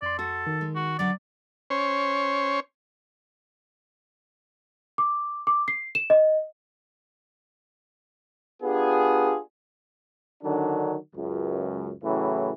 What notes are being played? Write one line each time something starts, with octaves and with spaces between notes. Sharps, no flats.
F2 D5 C6
F#4 A4
D#3
G#3
F#4
D3 F#3 D5
C#4 C5 C#5
D6
D6
C7
E7
D#5
B3 D4 F4 G4 G#4
D3 D#3 F#3 D4
C#2 F#2
A2 C#3 E3 F#3